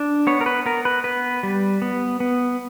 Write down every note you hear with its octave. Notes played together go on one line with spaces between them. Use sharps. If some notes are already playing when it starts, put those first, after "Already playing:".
Already playing: D4
B3 C#5
A#4
B4
B3 A#4
B4
B3 B4
G3
B3
B3